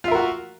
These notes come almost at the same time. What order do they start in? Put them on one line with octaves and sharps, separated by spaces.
F4 E5 A#4 F#4